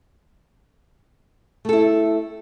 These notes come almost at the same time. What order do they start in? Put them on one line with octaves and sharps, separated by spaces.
A3 A4 E4 C4